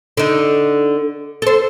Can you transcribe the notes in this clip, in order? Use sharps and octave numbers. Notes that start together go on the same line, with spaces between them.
D3 D#4
A4 C5